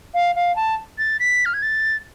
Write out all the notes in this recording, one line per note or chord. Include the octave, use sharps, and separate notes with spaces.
F5
F5
A5
A6
B6
F6
G#6
A6